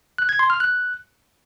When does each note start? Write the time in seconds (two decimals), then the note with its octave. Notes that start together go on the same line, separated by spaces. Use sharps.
0.18 F#6
0.29 G#6
0.39 C6
0.50 F6
0.60 F#6